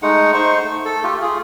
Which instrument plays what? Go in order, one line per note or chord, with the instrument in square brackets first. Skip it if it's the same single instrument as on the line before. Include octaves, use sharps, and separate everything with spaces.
[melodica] G#3 A3 D#4 F#5
D#4 C5 F#5 C#6
A3
A4
A3 F4 G4
F4 G#4